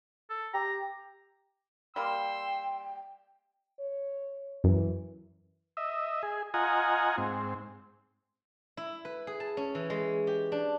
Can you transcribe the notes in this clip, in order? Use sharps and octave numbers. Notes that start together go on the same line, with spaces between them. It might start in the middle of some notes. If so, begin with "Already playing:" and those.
A4
G4 A#5
G3 A#3 G5 C6 E6
C#5
F#2 E3
D#5 E5
G#4
F4 D#5 F#5 G#5 A#5
G#2 C4
E4
B4
G#4
A5
C#4
E3
G#3
G4
D4